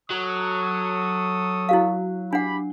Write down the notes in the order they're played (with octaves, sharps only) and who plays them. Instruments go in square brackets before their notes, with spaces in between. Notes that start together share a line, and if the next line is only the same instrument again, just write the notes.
[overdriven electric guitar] F#3 [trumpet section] A4 C#6 D#6
[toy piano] E4 F#4 F5
[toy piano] D4 F#5 [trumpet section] G4 B5